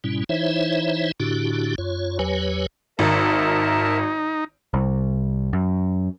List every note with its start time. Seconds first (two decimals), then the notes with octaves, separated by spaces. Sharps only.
0.04 G#2 B2 G3 C#4 E4
0.29 E3 D#4 E4 C5 C#5 E5
1.20 A2 D3 D4 E4 F#4 G4
1.78 F#2 F4 C#5
2.19 E2 F#3 G4 B4 C#5 G#5
2.99 G#1 D#4 A#4 E5 A5
4.74 C2
5.53 F#2